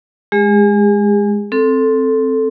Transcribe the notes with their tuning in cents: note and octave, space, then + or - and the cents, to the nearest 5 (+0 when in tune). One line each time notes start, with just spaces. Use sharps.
G#3 +0 G#4 -45
C4 +0 A4 +0